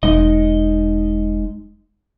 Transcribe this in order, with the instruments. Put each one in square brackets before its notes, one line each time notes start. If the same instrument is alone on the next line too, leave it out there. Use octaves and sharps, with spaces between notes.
[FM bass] E1 [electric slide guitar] G#3 D#4 D#5